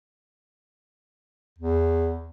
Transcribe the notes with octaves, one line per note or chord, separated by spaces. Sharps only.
E2